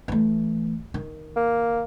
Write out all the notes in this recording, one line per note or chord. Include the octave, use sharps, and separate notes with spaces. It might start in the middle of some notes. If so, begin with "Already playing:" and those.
E3 A3
D#3
A#3